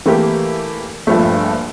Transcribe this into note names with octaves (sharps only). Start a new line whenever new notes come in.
E3 A3 A#3 G4
A#1 G2 F3 A3